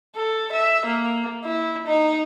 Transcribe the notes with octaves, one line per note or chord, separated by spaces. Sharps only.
A4
E5
A#3
E4
D#4